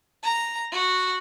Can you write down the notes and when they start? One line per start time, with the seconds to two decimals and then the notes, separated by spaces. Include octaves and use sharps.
0.23 A#5
0.72 F#4